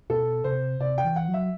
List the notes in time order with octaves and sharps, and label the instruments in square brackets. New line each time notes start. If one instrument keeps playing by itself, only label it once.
[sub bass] B2 [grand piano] A4
[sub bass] C3 [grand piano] C5
[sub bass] C3 [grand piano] D5
[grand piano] G5
[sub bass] E3
[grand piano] F#5
[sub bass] F#3
[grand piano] E5